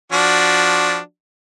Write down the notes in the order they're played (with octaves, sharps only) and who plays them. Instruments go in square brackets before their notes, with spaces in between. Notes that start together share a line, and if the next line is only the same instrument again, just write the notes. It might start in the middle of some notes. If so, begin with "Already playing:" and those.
[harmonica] F3 D4 F#4